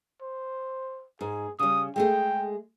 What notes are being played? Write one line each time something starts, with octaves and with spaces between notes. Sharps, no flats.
C5
G#2 G#4
C#3 G3 D#6
G#3 A3 G#4 G5